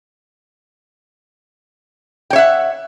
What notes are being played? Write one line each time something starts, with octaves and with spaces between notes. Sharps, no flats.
C#5 E5 F#5 G5